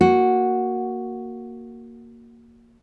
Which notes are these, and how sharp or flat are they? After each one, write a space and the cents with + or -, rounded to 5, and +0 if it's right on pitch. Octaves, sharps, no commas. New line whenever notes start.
A#3 +0 F#4 +0